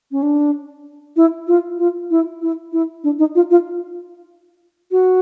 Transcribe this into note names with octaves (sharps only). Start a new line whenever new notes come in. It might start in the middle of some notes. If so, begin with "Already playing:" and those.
C#4
D4
E4
F4
F4
E4
E4
E4
D4
D#4
F4
F4
F#4